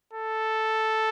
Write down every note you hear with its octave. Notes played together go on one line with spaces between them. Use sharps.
A4